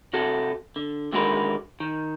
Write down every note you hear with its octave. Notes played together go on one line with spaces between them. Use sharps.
C3 F#4 A4
D3
D3 D#3 G#3 F#4 A#4 B4
D#3